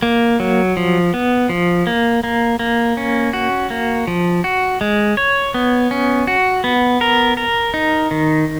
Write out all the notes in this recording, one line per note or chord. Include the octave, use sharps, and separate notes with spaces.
A#3
F#3
F3
B3
F3
A#3
A#3
A#3
C#4
F#4
A#3
F3
F#4
G#3
C#5
B3
C#4
F#4
B3
A#4
A#4
D#4
D#3